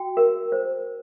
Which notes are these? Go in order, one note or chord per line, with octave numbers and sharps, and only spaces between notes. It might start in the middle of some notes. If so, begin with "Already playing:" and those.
Already playing: F#4 G5
A#4
C5